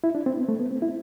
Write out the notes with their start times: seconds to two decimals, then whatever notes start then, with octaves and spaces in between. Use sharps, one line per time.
0.04 E4
0.15 D4
0.26 C4
0.37 B3
0.49 A3
0.60 B3
0.71 C4
0.82 E4